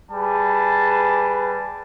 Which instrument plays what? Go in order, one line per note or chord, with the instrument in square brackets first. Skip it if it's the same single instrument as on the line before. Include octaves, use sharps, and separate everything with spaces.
[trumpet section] G3 G#4 B4 A5